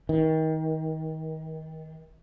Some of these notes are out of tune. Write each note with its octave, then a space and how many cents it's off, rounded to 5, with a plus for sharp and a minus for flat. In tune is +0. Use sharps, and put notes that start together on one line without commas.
D#3 +30